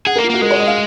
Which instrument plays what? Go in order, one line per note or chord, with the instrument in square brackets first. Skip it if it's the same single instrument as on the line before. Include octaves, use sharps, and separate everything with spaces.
[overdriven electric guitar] G#4 [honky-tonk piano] F#5
[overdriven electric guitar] A#3 [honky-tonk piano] A#4
[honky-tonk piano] F4
[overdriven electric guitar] A#3 [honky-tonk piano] F#4
[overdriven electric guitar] G#3 [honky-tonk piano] A#4
[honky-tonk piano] C#5
D#5
F5